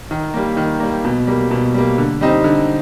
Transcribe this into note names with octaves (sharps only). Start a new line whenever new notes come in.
D#3
G3 A#3
D#3
G3 A#3
B2
G3 A#3
B2
G3 A#3
D3
G3 C4 D#4
D3